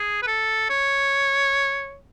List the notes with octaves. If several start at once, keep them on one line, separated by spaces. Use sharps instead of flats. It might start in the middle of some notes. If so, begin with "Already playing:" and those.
Already playing: G#4
B4
A4
C#5